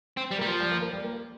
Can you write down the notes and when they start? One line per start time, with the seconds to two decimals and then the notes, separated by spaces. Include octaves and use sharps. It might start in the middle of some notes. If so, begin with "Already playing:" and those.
0.17 C4
0.31 G3
0.38 A#3
0.41 G3
0.46 F3
0.60 G3
0.71 A#3
0.82 A#3
0.93 G3
1.04 A#3